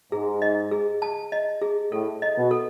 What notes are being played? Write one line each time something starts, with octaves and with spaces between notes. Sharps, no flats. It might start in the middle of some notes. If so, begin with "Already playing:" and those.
G#2 G#4
D#5
G#4
A5
D#5
G#4
A2 A4
D#5
B2
A4